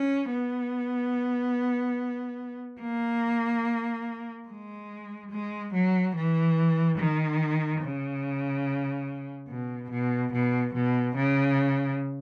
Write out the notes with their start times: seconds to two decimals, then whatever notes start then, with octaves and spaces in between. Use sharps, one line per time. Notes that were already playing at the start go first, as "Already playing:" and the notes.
Already playing: C#4
0.31 B3
2.81 A#3
4.48 G#3
5.31 G#3
5.73 F#3
6.15 E3
6.98 D#3
7.81 C#3
9.48 B2
9.90 B2
10.32 B2
10.74 B2
11.16 C#3